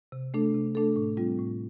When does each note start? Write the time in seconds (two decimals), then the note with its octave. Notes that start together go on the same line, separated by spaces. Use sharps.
0.12 C3
0.34 A3 D4 A4
0.54 C3
0.75 A3 D4 A4
0.96 A2
1.17 G3 C4 F4
1.39 A2